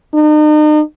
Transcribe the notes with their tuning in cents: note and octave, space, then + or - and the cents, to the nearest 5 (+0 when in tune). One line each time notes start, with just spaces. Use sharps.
D#4 -40